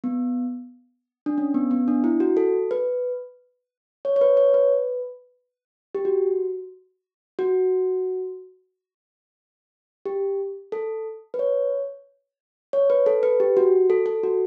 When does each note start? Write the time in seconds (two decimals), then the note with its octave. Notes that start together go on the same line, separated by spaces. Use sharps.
0.04 B3
1.26 D4
1.38 C#4
1.54 B3
1.71 B3
1.88 D4
2.04 E4
2.20 F#4
2.37 A4
2.71 B4
4.05 C#5
4.16 C#5
4.21 B4
4.37 C#5
4.54 B4
5.95 G4
6.05 F#4
7.39 F#4
10.06 G4
10.72 A4
11.34 B4
11.39 C#5
12.73 C#5
12.90 B4
13.06 A4
13.23 B4
13.40 G4
13.57 F#4
13.90 A4
14.06 A4
14.23 F#4